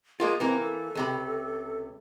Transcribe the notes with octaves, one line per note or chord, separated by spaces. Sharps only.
G#3 A#3 F4 G#4
E3 A#3 C4 A#4
A4
C#2 C3 B5